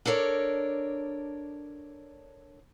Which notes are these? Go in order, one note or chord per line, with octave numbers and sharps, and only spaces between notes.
D4 A4 A#4 C#5 D5